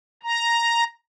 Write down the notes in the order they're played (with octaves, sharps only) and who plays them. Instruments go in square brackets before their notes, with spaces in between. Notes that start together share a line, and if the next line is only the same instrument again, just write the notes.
[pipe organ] A#5